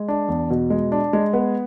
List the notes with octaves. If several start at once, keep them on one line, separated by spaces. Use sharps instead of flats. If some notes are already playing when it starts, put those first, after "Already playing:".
Already playing: G#3
D4
E2
B2
G#3
D4
G#3
B3